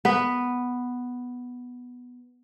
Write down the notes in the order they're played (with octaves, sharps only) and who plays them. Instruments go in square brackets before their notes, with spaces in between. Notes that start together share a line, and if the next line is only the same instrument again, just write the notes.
[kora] B3 B4